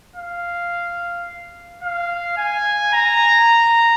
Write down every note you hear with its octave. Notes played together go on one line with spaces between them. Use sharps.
F5
F5
G#5
A#5